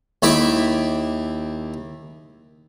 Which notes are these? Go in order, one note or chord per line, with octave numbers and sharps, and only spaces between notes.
D#2 E4 E5 D6